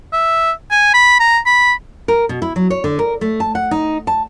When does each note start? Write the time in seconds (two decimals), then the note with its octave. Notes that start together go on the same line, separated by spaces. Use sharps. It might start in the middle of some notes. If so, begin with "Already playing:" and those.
0.13 E5
0.71 G#5
0.94 B5
1.20 A#5
1.46 B5
2.08 A#4
2.29 B2
2.42 E4
2.56 F#3
2.70 C#5
2.84 D3
2.99 A#4
3.21 A3
3.40 A5
3.55 F#5
3.71 D#4
4.07 A5